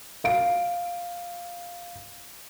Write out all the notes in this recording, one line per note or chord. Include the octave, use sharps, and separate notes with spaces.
F5 D7